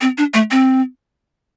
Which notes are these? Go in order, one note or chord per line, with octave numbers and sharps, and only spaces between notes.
C4
D4
A3
C4